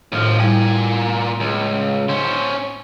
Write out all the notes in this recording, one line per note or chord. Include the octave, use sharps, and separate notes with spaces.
D#2 A2 F3 F6
A#2 G3 E4 G#5
C#2
C#4 C5